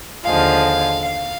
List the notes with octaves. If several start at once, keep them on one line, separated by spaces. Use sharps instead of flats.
D#2 D3 F3 G#3 F5
F5